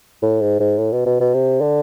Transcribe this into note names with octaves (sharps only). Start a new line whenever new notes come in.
A2
G#2
G#2
A2
B2
B2
B2
C3
D3